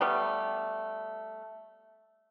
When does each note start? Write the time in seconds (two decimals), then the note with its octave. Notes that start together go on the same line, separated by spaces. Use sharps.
0.01 G3 A3 B3